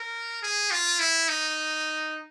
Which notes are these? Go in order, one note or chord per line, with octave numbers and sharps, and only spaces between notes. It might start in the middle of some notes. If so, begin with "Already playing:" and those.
Already playing: A#4
G#4
F4
E4
D#4